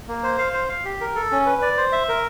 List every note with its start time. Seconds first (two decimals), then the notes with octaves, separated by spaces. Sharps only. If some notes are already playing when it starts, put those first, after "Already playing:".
0.08 A#3
0.23 C5
0.39 F5
0.54 C5
0.69 F5
0.85 G4
1.01 A#4
1.16 A4
1.31 C#4
1.46 B4
1.62 D5
1.77 C5
1.92 E5
2.08 A#4